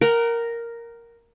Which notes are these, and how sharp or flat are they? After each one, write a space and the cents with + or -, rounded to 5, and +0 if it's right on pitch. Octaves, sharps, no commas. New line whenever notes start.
A#4 +0 F#5 +35